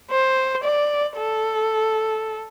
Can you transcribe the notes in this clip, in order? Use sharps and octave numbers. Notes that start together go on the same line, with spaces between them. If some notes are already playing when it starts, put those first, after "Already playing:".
C5
D5
A4